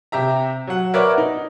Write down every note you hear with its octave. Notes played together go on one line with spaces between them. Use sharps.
C3 G4 E5 A#5
F#3 F#5
A#4 B4 C#5 D5 E5 F#5
D#4